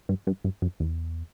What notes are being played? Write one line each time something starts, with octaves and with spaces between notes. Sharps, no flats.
G2
G2
G2
F#2
E2